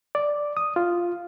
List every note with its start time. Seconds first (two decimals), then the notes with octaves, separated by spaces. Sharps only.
0.15 D5
0.57 D#6
0.76 F4